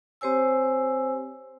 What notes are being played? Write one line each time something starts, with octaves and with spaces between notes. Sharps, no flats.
C4 G4 C5 C#5 G#5 E6